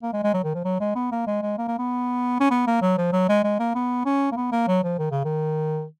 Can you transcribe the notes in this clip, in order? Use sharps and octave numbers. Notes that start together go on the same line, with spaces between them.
A#3
G#3
G#3
F#3
D#3
F3
F#3
G#3
B3
A#3
G#3
G#3
A#3
A#3
B3
C#4
B3
A#3
F#3
F3
F#3
G#3
G#3
A#3
B3
C#4
A#3
B3
A#3
F#3
F3
D#3
C#3
D#3